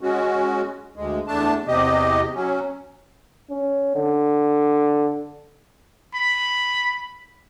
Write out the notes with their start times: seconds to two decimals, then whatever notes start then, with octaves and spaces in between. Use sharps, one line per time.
0.01 G#3 C#4 F#4
0.96 D2 G#3
1.28 E2 A3 D4 A5
1.68 E2 C3 G4 D#5
2.35 F#3 C#4
3.50 C#4
3.95 D3
6.14 B5